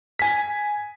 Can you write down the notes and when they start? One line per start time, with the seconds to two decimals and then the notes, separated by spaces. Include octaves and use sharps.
0.19 G#5 B6